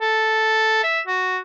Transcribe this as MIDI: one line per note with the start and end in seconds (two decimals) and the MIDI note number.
0.01 0.82 69
0.83 1.00 76
1.07 1.38 66